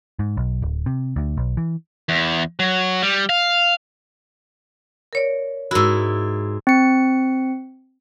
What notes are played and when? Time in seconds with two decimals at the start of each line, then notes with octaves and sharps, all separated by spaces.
0.19 G#2
0.37 B1
0.62 D1
0.86 C3
1.16 D2
1.37 B1
1.57 E3
2.09 E2
2.60 F#3
3.02 G3
3.29 F5
5.13 A#4 C#5 D5
5.71 G#2 E4 F#4 A#4 E6
6.67 C4 C#7